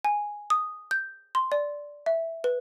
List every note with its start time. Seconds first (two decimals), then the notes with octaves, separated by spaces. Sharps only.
0.04 G#5
0.50 D#6
0.91 G6
1.35 C6
1.52 D5
2.06 E5
2.44 B4